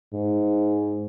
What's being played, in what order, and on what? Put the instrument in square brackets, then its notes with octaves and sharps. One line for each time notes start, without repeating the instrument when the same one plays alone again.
[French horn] G#2